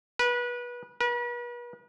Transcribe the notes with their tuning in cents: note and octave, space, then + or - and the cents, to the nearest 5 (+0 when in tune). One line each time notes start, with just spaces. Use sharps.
B4 -25
B4 -40